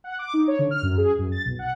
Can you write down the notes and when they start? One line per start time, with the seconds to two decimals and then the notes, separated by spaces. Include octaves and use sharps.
0.04 F#5
0.19 D6
0.34 D#4
0.48 C#5
0.59 D3
0.71 F6
0.83 F#2
0.98 G#4
1.19 F#2
1.32 A6
1.45 B1
1.59 F#5